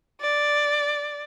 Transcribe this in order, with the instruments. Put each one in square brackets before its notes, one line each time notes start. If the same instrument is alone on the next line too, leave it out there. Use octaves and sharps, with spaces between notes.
[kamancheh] D5